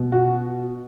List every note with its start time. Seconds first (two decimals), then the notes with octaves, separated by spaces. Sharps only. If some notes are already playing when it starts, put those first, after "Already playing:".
Already playing: B2
0.12 F#4